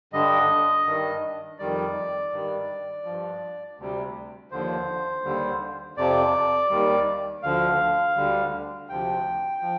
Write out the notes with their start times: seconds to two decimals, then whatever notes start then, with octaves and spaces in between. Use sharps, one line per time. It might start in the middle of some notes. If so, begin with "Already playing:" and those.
0.13 G2 D3 G3 D#5
0.86 G2 D#3 G3
1.59 F2 D#3 G3 D5
2.32 G2 D#3 G3
3.05 G2 F3
3.78 D2 C3 G3
4.51 D#2 D3 F3 C5
5.24 D#2 D3 G3
5.97 F2 C3 F3 D5
6.70 D#2 D#3 G3
7.43 D2 D3 F3 F5
8.16 D2 D3 G3
8.89 D2 C3 F3 G5
9.62 F3